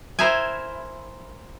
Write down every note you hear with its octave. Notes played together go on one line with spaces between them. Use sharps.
E4 A#4 C5 E5 G#5